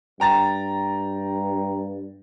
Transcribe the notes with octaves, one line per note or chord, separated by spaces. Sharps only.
G2 G5 A#5 A6